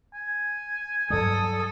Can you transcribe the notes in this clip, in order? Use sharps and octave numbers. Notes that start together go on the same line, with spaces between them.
G#5
G2 F#3 G3 A4 D#6